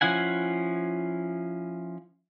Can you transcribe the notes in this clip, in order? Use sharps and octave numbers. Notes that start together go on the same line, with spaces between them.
F3 C#4 E4 F#5 G#5